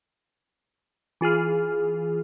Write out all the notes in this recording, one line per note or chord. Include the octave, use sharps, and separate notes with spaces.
E3 F4 G#4 F6